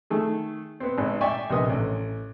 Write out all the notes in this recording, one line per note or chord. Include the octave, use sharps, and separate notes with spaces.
D#3 A3 G#4
B3 C4
G#1
D5 E5 G5 G#5 C#6
A#1 C3 B3 A#4 D#5 D#6
A1